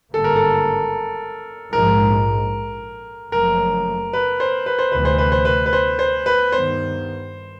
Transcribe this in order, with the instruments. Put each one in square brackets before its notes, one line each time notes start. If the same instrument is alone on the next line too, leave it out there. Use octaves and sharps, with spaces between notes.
[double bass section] G#1 G2 D3 G3 A#3 [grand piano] A4
[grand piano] A#4
A4
[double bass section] A#1 G#2 F3 G#3 [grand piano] A#4
[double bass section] F#1 F#2 C#3 F3 A3 [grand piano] A#4
[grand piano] B4
C5
B4
C5
[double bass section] D2 C3 E3 [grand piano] B4
[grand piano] C5
B4
C5
B4
B4
C5
C5
B4
[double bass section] G2 D#3 G3 B3 [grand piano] C5